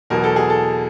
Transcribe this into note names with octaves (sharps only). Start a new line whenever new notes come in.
E2 B2 F#3 A#4
A4
G#4
A4